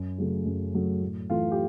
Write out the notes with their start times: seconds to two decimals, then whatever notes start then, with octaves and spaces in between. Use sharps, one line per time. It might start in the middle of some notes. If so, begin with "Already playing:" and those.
Already playing: F#2
0.18 C#3 F#3 A3
0.45 F#2
0.74 C#3 F#3 A3
1.02 A2
1.30 E3 A3 F4
1.52 G4